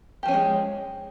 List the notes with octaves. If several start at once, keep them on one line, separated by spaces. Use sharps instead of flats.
F3 G3 G#3 C#4 G4